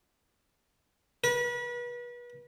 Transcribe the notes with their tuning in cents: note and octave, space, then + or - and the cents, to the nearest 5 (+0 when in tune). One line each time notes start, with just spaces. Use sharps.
B4 -35